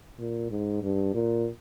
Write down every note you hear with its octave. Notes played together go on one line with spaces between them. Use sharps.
A#2
G#2
G2
A#2